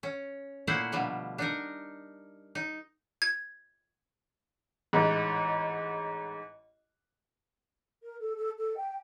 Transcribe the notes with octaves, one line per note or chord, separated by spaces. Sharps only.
C#4
A#2 A3 A#3 E4 C5 F#5
B2 D3 F3 G3
D4 D#4 A#4
D#4
G#6
A1 G#2
A#4
A4
A4
A4
G5